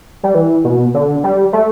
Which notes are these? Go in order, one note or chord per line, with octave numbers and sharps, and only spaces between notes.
G3
E3
B2
D3
G3
A3